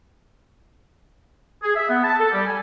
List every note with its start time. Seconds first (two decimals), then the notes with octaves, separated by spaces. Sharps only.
1.63 G#4
1.76 E5
1.89 B3
2.04 A5
2.19 A4
2.32 G3
2.47 G#5